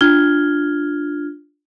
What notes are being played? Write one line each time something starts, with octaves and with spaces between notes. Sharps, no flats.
D4 F4 F6 G#6 G7